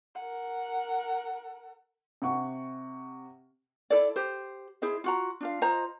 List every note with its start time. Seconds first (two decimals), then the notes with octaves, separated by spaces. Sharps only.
0.15 A#4 F#5
2.22 C3 F#5 C#6
3.90 E4 A4 D5
4.16 G4 C5
4.82 E4 G#4 C5 D#5
5.04 F4 F#4 A#5
5.41 D4 F4 F5
5.61 F4 C5 D#5 A#5